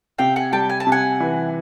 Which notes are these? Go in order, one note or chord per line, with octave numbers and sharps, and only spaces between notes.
C3 F5 G5
F#5 G#5
G3 G5 A5
G#5
A5
C3
F#5 G#5
E3